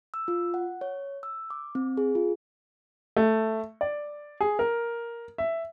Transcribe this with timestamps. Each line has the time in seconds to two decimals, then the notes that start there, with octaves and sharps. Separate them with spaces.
0.14 E6
0.28 F4
0.54 F#5
0.81 C#5
1.23 E6
1.50 D6
1.75 C4
1.97 G#4
2.15 F4
3.17 A3
3.81 D5
4.40 G#4
4.59 A#4
5.38 E5